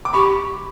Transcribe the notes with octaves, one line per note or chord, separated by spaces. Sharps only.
D6
G4 B5 C#6